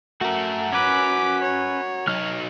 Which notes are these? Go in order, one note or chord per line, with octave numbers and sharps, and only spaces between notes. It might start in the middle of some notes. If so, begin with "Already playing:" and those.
A3 F#4 A#4
C#4 B4 D6 B6
C#5
F#3 D#4 F6